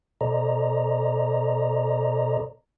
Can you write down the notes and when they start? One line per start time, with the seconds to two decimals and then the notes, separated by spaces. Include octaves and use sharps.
0.21 B2 A4 C5 D5 D#5 A#5